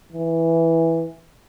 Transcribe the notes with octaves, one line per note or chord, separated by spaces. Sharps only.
E3